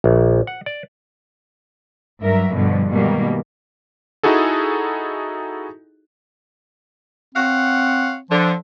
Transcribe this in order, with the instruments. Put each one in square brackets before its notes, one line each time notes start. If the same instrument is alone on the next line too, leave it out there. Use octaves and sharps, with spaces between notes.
[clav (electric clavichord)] A#1
F#5
D5
[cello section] G2 F#3 A#4 E5
G2 B2 D3 F3
B2 D#3 G3 G#3 A#3
[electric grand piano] D#4 E4 F#4 G#4 A4
[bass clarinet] C4 [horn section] C#5 F5 F#5
[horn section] D3 [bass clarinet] F3